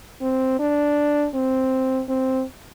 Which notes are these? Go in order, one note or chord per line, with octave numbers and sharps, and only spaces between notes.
C4
D4
C4
C4